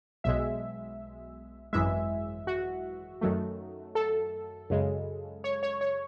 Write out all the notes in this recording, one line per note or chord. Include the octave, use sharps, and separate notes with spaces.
B1 B2 G#3 E5
G#1 F#2 E3 G#3 E5
F#4
F#2 D#3 F#3 A3
A4
F#2 C#3 G#3
C#5
C#5
C#5